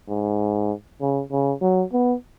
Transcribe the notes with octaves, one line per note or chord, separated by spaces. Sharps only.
G#2
C#3
C#3
F#3
B3